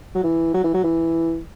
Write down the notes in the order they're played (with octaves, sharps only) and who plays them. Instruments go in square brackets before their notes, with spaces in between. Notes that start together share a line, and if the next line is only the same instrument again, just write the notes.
[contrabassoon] F#3
E3
F#3
E3
F#3
E3